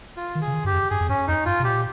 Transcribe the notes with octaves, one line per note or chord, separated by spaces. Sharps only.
F4
D#3
G#4
C#3
D#3
G2 G4
F2
G2 G#4
F2
G2 C#4
F2 D#4
G2 F4
C3
A#2 G4